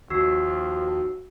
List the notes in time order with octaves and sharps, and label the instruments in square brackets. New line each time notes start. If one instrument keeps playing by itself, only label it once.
[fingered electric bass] D#2 [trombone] F3 [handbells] F#4 [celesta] E6 C7